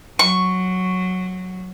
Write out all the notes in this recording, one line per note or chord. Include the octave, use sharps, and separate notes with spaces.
F#3 C#6